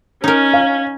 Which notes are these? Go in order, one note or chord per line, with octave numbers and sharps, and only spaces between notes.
C#4 D#4 A#4
F5